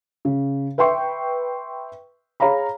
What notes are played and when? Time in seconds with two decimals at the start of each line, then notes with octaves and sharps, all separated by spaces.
0.25 C#3
0.78 B4 E5 G5 C6 C#6
2.40 G#4 C#5 F5 A#5 B5